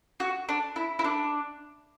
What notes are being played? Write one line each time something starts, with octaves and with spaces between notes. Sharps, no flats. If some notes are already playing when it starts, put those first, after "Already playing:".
F#4
D4
E4
E4
D4